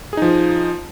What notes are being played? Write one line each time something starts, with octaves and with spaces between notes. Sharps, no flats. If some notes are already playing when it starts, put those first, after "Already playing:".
F3 D#4 G#4